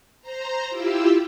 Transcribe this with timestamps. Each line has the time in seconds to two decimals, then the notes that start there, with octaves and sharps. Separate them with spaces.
0.21 C5 A#5
0.69 E4 F4 G4 E5